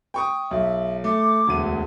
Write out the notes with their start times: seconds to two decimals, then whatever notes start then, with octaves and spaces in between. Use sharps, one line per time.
0.14 G5 C#6 D#6
0.51 B1 E5
1.04 A3 D6
1.47 E1 D2 D#7